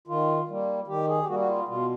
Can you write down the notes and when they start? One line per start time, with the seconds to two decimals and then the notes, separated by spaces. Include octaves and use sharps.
0.07 D#3 F4
0.48 G3 A#3
0.87 D#3 G4
1.07 G#4
1.22 G4
1.28 G3 A#3 F#4
1.39 F#4
1.47 F4
1.68 B2 F4